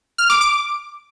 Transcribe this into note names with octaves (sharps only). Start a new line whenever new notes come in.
F6
D6
D6